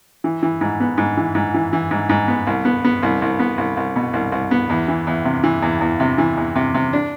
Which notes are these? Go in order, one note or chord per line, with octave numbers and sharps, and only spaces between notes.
E3
E3
G#2
B3
G#2
E3
G#2
E3
E3
G#2
G#2
B3
C2
B3
B3
C2
C2
B3
C2
C2
B2
C2
C2
B3
E2
E3
E2
C3
E3
E2
E2
C3
E3
E2
C3
C3
D4